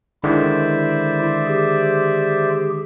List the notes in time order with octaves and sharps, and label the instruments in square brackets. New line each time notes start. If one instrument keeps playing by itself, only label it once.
[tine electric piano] D3 D#3 G#3 [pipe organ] E4 [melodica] C5 D5 E5
[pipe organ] G4 G#4